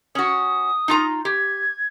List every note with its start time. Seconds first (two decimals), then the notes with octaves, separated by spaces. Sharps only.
0.15 C#4 F#4 D#6
0.88 D#4 F4 A#5
1.25 G4 G#6